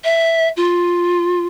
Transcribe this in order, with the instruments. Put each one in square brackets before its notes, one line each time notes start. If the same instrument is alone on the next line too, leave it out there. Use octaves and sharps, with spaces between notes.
[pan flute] E5
F4